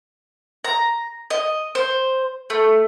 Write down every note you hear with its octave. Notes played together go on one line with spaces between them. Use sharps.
A#5
D#5
C5
A3